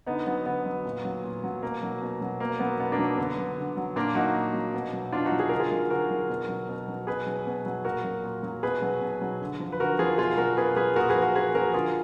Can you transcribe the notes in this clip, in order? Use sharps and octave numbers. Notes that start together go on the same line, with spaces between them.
D3 B3 D#4
F#3 B3
D3 B3
F#3
A#2
F#3
A#2
F#3
B2 A#3
F#3
B2
F#3
B2 A#3
F#3 B3
B2 B3
A#3 D4
F#3
D3 B3
F#3
D3
F#3
A#2 A#3 D4
F#3 D#4 F#4
A#2
F#3
B2
F#3
B2 D4 F4
D#4 F#4
F#3
G#4
D3 A#4
F4 G#4
F#3
D3 F#4 A#4
F#3
B2
F#3
B2
F#3
B2 G#4 B4
F#3
B2
F#3
A#2 F#4 A#4
F#3
A#2
F#3
B2 G#4 B4
F#3
B2
F#3
D3
F3
B4
D3 F#4 A#4
F3 F4 G#4
B2 F4 G#4
F#3 F#4 A#4
B2 G#4 B4
F#3 G#4 B4
A#2 F#4 A#4
G#4 B4
F3
F#4 A#4
A#2 G#4 B4
F3 F#4 A#4
D3 F4 G#4